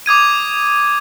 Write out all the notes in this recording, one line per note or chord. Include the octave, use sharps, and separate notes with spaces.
D6 D#6 G#6 D#7